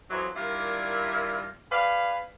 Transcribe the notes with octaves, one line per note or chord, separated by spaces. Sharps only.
F2 E3 F#3
D#3 G3 D4 E4 F4 A#4
G#4 B4 D5 F5